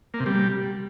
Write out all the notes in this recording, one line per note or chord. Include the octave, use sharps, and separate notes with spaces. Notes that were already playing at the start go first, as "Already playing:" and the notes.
A#3
C3
G3